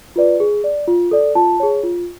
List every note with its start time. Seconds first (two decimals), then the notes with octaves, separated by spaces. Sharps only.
0.16 F4 B4 D5
0.40 G#4
0.64 D5
0.88 F4
1.11 A4 D5
1.35 F4 A5
1.60 G#4 C#5
1.83 F4